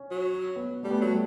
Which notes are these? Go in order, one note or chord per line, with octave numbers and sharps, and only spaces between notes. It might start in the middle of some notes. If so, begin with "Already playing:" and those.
Already playing: C#4
F#3
B3
G3 A3
B3
F#3 A3
G3